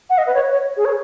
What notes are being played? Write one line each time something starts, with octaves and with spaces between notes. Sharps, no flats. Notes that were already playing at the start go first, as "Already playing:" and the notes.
F#5
D#5
B4
C#5
C#5
G#4
C#5